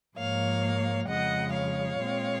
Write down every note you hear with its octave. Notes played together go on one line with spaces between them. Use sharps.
G#2 F3 A#3 C#5 F5
F2 C#3 G#3 D#5 F#5
C#5 F5
A#2 G#3 C4